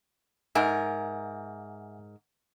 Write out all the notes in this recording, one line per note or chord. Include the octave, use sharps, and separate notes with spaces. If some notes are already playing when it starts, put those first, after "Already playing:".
G#2 A#4 E5 F#5 G#5